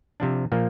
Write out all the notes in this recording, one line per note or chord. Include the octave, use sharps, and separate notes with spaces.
C3 F3 D4
A#2 F3 A#3